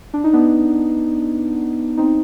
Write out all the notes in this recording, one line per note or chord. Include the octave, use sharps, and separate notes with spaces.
D4
D#4
B3 D4
C4 D#4